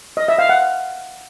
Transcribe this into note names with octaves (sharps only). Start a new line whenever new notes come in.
D#5
E5
F5
F#5